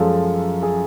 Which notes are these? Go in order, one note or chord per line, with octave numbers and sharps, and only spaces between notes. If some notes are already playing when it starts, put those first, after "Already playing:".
Already playing: F#2 F3 G#3 A4
G#4